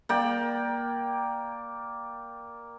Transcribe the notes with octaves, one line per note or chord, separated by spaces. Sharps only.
A#3 D5 G5